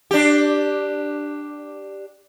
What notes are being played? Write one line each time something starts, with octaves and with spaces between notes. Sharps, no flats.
D4 G4